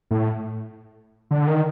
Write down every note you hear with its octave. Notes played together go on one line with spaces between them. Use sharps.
A2
D3
D#3